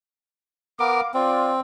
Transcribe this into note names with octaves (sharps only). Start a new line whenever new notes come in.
B3 A#4 F5 D6
C4 F4 D5